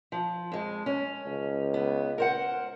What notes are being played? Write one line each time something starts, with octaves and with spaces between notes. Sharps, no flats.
F3
F2 G#3
C#4
C#2
B3
A#4 C5 F#5